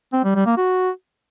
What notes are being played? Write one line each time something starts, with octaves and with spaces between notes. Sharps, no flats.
C4
G3
G3
A#3
F#4